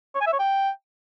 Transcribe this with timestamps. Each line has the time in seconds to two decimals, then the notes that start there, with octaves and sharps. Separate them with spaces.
0.15 C#5
0.21 G#5
0.27 E5
0.33 C#5
0.39 G5